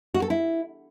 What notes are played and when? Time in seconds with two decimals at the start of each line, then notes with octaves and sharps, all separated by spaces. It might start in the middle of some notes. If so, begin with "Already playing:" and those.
0.14 F#4
0.22 A4
0.30 E4